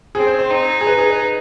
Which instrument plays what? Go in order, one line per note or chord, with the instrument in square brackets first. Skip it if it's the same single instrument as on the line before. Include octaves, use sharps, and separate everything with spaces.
[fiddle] C4 [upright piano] G#4
[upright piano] C5
C5
[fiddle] D#4
[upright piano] G#4
B4
G#4
B4